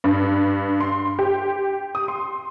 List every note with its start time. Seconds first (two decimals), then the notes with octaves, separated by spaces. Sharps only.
0.04 G2
0.80 C6
1.19 G4
1.95 D#6
2.08 C6